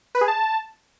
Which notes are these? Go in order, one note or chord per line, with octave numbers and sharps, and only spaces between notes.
B4
G#4
A5